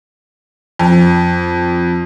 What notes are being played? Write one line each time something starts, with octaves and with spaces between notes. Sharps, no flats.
F2